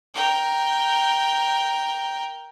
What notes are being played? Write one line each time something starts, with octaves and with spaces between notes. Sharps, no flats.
A#4 G5